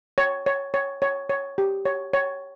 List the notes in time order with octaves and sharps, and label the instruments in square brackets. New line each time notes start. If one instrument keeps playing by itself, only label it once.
[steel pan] C#5
C#5
C#5
C#5
C#5
G4
C#5
C#5